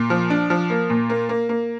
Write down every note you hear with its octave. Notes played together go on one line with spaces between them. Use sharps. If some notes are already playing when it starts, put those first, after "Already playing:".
Already playing: A#2
F3
D4
F3
A#3
A#2
A#3
A#3
A#3